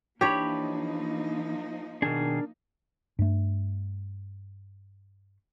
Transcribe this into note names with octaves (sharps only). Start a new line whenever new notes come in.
E3 F3 A#3 D4 D#4 G4 C#5 B5
B2 D#3 D4 G#4 A#4
G2 A3